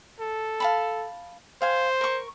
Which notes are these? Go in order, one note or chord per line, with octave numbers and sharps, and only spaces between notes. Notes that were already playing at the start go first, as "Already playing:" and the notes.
A4
F5 A5 B5
C5 F5 G#5
A#4 C#6